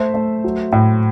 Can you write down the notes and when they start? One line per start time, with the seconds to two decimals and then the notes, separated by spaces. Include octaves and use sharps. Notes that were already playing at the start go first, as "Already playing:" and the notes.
Already playing: A3 C5 E5
0.14 A3
0.44 F#3
0.73 A2